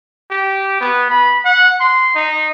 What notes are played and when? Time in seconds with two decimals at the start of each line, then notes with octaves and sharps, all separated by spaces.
0.31 G4
0.80 B3
1.10 B5
1.45 F#5
1.80 C6
2.15 D#4